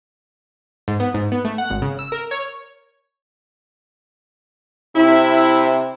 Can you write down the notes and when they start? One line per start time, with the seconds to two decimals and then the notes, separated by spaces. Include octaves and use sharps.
0.88 G#2
1.00 B3
1.14 G#2
1.32 B3
1.45 A3
1.58 F#5
1.70 G#1
1.82 C#3
1.99 E6
2.12 A#4
2.31 C#5
4.96 C3 E4